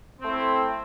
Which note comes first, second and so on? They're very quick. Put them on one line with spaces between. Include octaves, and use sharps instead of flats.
C4 A3 E4